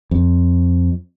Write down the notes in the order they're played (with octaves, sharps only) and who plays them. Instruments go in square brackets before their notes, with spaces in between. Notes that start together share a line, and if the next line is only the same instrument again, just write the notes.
[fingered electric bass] F2